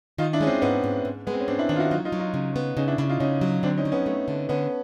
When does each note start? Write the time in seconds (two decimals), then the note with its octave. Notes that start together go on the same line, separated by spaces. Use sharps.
0.18 D#3 D#4 F4
0.33 D4 E4
0.41 G#3 C#4
0.47 C4 D4
0.62 G#2 B3 C#4
0.84 G#2
1.05 G#2
1.27 G#3 B3
1.33 C4
1.40 C#4
1.48 G#2 C4 D4
1.59 D4 E4
1.69 D#3 D4 E4
1.76 F4
1.80 E4 F#4
1.91 F#3 D#4 F4
2.05 D#4 F4
2.12 F#3
2.19 D#4 F4
2.34 C#3
2.56 B3
2.77 C#3 C#4 D#4
2.88 D4 E4
2.98 C#3 D4 E4
3.09 D#4 F4
3.20 C#3 C#4 D#4
3.41 F#3
3.63 D3 C4 D4
3.77 C#4 D#4
3.85 F#3
3.92 B3 C#4
4.06 A3
4.28 D3
4.49 D3 B3 C#4